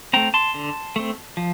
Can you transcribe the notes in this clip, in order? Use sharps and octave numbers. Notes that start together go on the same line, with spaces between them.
A3 C4 G5 A#5
A5 C6
D3
A3 C4
F3